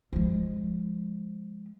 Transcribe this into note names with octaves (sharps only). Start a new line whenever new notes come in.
F3 G#3